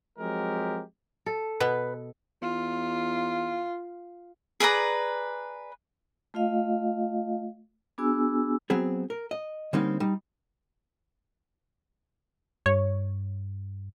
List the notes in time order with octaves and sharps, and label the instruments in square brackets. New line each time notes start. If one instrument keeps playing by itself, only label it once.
[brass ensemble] F3 F#3 G#3 C4 G4 A#4
[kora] A4
[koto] B2 B3 [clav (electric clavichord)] B4
[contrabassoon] E2 [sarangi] F4
[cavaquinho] G#4 B4 D5 A#5
[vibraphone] A3 F4 D#5 F5
B3 D4 F#4 G#4 G#5 E6
[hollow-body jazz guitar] F#3 B3 C4 G#4
A#4
D#5
D3 G3 A#3 C4 C#4 D#4
G3 D#4
[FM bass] G2 [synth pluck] C#5